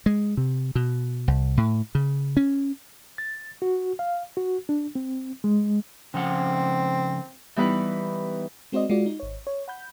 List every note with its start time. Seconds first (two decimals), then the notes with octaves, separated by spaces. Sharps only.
0.06 G#3
0.37 C3
0.75 B2
1.28 C2
1.57 A2
1.95 C#3
2.37 C#4
3.18 A6
3.62 F#4
3.99 F5
4.37 F#4
4.69 D4
4.95 C4
5.44 G#3
6.14 C#3 F3 C4 F#5
7.56 E3 G3 B3 D#4 E4 B4
8.72 G#3 C4 F#4 C5 D5 D#5
8.90 G#3 F4 F#4 D5
9.06 D#4
9.20 G#1 C#5
9.47 C#5
9.68 F#5 B5 G6